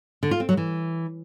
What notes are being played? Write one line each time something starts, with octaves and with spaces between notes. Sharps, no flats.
D3
F4
C4
F#3
E3